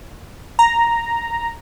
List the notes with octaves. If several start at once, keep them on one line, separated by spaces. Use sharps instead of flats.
A#5